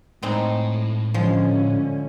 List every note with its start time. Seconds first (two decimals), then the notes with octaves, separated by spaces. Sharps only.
0.23 A2 G#3 C4 D#4
1.14 D3 F3 G#3 C#4